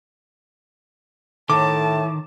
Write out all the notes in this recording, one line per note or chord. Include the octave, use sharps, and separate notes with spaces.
A2 D#3 A5 D6